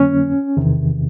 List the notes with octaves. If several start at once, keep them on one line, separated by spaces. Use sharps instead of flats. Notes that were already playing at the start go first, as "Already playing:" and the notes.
Already playing: F2 D3 F#3 A#3 C#4
E2 C3 D#3